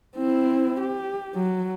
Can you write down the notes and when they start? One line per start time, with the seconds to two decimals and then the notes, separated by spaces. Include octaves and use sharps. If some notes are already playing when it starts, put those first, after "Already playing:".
0.16 C4 E4
0.80 G4
1.35 F#3